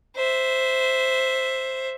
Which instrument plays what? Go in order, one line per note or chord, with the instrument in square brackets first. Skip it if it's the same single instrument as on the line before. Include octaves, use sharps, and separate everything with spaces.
[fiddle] C5 E5